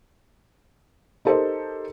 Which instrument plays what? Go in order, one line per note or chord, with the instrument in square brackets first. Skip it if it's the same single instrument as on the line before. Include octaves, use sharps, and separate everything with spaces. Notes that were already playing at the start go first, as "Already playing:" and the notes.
[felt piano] D#4 G4 A4 A#4 C5 D#5